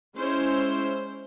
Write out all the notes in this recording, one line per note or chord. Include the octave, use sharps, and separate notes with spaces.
G#3 C#4 E4 C5